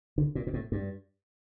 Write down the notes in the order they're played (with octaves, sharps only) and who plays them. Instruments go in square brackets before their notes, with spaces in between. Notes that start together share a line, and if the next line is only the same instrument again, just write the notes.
[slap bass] D3
A#2
A#2
A2
G2